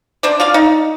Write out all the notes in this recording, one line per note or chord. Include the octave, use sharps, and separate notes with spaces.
D4 C5 D5
F4 D5 F5
D#4